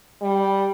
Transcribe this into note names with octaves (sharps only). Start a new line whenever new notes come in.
G3